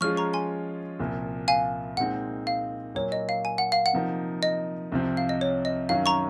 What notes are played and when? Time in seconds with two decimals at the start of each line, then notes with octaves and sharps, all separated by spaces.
0.01 F3 G#3 C#4 F4 G#4 C#6 F6
0.17 A#5 C#6
0.33 G#5 C6
0.99 C2 A#2 F3
1.48 F5 G#5
1.97 A#2 G#3 C4 D#4 F#5
2.47 F5
2.95 A#2 F#3 A#3 C#5
3.12 D#5
3.29 F5
3.45 G#5
3.58 F#5
3.72 F5
3.86 F#5
3.93 C3 F3 A#3 D#4 A#4
4.43 D#5
4.92 C2 C3 F3 C4
5.17 F5
5.29 D#5
5.41 C#5
5.65 D#5
5.89 F#2 D#3 F#3 C#4 F5
6.06 A#5 C#6